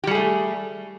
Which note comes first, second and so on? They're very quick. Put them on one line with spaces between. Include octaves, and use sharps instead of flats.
G4 G3 G#4 A3